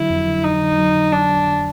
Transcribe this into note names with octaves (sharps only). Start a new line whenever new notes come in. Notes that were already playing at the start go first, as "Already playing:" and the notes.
Already playing: D3 F#3 E4
F2
D3
D3 D#4
D3
F#3
D3
F#3 D4
F#3
D3